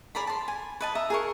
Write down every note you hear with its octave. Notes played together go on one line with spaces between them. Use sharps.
G#4 D5 A#5 B5
A5 C6
G#5
B4 D#5 A5
E5 A#5 D#6
G#4 A#4 C#6